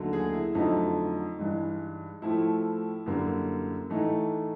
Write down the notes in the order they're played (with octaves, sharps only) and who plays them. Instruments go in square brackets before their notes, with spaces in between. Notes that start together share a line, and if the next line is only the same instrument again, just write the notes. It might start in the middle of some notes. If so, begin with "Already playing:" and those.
Already playing: [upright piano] D#2 D3 F#3 A3
G#4
E4
F2 D3 F#3 A3 D#4
G2 E3 G#3
A2 F3 A3 E4
F#2 D3 G3 A#3
A2 E3 A3 D#4